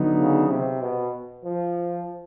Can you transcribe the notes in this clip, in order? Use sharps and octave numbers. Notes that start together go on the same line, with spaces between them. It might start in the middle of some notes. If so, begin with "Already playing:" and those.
Already playing: D3 F#3 B3 D#4
C#3
C3
B2
F3